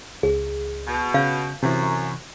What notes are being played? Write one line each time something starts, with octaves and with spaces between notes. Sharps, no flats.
C#2 G#4
B2
C#3 F5 G6
F#2 C3 E3